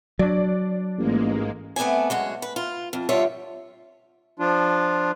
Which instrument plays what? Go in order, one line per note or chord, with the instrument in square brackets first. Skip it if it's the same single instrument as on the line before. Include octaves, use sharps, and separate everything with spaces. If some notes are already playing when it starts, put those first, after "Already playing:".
[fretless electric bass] F#3 [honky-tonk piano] D4 D5
[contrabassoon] A1 [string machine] G#2 G#3 A#3
[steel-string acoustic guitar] A3 B3 C4 D5 G#5
F#2 G#3 F#4
B4
F4
F2
G2 D3 G3 F4 C#5 E5
[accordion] F3 D4 F4